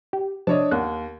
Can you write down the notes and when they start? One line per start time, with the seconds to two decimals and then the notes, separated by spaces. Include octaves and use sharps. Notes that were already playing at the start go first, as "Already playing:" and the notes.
0.13 G4
0.47 C3 F3 D4 C#5 D#5 A5
0.71 D#2 F#5